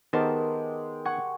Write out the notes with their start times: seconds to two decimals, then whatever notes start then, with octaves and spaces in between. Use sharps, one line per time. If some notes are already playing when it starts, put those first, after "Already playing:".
0.13 D#3 G#3 B3 G4 A#4 C5 A5
1.05 F#5 G#5 C#6